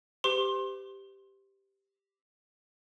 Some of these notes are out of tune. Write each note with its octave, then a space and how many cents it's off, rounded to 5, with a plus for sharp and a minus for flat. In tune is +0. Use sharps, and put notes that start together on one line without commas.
G4 +0 C5 -45 C6 +20